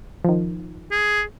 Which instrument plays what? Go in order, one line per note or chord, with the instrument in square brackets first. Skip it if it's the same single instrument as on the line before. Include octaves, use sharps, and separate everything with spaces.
[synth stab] D#3 F3
[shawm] G#4